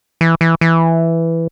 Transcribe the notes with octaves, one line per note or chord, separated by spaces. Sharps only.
E3
E3
E3